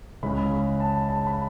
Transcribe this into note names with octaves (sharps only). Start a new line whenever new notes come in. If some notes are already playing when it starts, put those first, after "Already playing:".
C#2 C#3 G#3 C#4 E4 B5
B5
A5
A5
B5